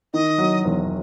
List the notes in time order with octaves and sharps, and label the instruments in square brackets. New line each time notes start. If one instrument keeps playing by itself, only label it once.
[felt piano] D#3 [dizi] D#5
[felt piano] F#3
E1